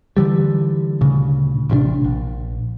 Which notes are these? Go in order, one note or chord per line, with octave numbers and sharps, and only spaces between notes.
D3 E3 G3
D2 A#2 C#3
A1 G2 C3 D4
A#1